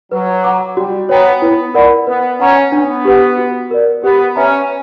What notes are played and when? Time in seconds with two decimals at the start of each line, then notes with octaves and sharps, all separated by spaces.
0.11 F#3 B4
0.44 F#5 A#5 D6
0.76 G3 F#4
1.09 B3 C#5 G5 A#5
1.42 B3 E4
1.74 A#4 D5 F#5 B5
2.07 B3 B4
2.39 C#4 F#5 A#5 C#6
2.72 B3 D4
3.05 G4 B4 F#5
3.38 F#4
3.71 A#4 D5
4.02 B3 G4
4.36 C#4 B4 E5 A#5